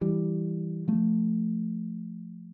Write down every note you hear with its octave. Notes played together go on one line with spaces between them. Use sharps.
E3 G3
F3 A3